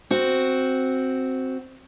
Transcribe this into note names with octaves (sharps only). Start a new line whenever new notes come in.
C4 F#4